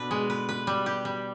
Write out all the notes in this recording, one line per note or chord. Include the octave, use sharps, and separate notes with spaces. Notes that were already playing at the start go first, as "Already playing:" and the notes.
Already playing: B2 D4 B4
G#3
B4
B4
G3
G4
G3